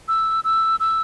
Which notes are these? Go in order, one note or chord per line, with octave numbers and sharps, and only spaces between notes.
E6
E6
E6